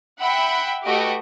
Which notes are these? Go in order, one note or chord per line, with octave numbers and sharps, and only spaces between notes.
E5 F#5 G5 B5
A3 F#4 G4 B4 D#5 D7